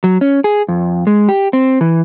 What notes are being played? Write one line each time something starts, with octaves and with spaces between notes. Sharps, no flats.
F#3
C#4
G#4
F2
G#3
G4
C4
E3